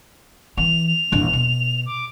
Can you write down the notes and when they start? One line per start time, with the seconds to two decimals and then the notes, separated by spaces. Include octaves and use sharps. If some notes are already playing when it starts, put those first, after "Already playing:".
0.57 E3 F7
0.87 F7
1.12 A#1 E2
1.33 B2
1.86 D6